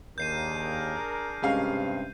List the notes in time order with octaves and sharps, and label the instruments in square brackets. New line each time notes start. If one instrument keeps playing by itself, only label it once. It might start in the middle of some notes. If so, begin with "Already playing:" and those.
[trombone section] D#2 [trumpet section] D4 G#4 A#4 [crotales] G6 C7 D#7
[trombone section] G2 C3 [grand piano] G#3 C#4 F5